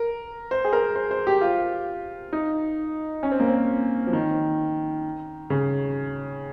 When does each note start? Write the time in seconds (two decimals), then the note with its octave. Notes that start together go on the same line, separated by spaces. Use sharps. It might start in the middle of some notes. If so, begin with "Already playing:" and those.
Already playing: A#4
0.51 C5
0.65 G#4
0.73 A#4
0.96 C5
1.11 C5
1.27 G4
1.41 F4
2.33 D#4
3.23 C#4
3.31 C4
3.40 A#3
3.48 C4
4.07 F3
4.13 D#3
5.50 C#3